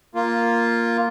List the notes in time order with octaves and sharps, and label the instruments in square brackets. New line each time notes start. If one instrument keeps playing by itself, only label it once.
[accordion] A#3 F4